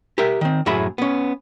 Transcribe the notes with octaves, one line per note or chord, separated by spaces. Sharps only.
G4 A#4 E5
D#3 C4
F#2 A2 G#4 E5 B5
B3 C#4